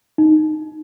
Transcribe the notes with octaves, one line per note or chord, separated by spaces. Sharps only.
D#4